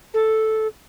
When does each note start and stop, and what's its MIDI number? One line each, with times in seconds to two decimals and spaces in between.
0.14 0.67 69